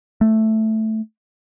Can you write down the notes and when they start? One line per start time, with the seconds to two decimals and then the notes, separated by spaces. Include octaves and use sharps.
0.21 A3